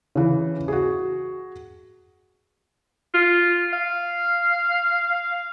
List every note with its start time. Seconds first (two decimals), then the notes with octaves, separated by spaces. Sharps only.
0.15 C#3 E3
0.68 F#4 G#4
3.14 F4
3.73 F5